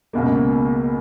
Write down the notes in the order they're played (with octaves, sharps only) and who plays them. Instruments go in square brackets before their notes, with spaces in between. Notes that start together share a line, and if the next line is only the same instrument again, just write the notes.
[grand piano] C#2 B2 A#3